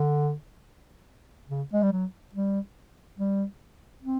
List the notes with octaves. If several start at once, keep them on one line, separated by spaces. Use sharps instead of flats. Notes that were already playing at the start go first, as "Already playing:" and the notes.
Already playing: D3
C#3
G#3
G3
F#3
G3
G3
C4